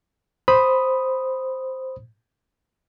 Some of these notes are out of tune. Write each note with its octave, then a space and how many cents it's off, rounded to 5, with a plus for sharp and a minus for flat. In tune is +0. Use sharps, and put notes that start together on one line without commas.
C5 +0 B5 +0 D#6 +0